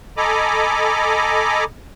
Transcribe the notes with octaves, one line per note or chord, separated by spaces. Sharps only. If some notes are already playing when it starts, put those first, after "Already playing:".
A4 D#5 G#5 A#5 B5 D6